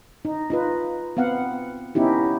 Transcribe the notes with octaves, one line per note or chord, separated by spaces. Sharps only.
D#4
D#4 F4 B4
B3 C4 F5 F#5
B3 C#4 D#4 E4 G4